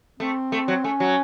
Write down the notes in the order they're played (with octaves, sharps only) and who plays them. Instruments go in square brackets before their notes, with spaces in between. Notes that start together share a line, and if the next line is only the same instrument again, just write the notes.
[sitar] A3 [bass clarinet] C4
[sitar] A3
F#3
[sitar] A3 [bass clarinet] C#4
[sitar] F#3